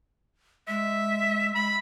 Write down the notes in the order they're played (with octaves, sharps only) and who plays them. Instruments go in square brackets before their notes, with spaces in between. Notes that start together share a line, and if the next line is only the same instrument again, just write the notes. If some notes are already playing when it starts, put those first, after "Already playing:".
[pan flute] G#3 [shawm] E5
[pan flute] G#3 [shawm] B5